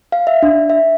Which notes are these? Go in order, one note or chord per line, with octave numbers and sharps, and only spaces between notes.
F5
E5
D4
E5